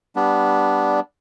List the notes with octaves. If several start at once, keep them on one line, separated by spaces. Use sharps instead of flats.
G3 B3 D4